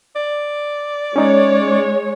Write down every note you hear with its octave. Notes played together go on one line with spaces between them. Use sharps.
D5
G#3 C#4 D#4 C#5